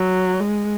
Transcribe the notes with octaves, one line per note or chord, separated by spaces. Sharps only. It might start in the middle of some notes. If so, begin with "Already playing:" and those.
Already playing: F#3
G#3